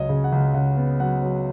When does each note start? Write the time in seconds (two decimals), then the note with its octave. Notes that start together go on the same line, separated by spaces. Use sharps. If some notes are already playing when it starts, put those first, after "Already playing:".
Already playing: C#2 F#3 C#5 D#5
0.09 C#3
0.24 F#5
0.32 C#2
0.54 C#3 F#5
0.77 B3
1.00 F#3 F#5
1.22 F#3